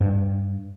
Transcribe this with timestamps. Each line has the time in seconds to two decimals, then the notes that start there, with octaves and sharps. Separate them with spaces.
0.01 G2